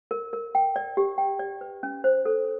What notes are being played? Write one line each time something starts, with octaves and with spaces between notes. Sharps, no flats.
A#4
A#4
G5
D5
G4
G5
D5
B4
C#4
C5
A4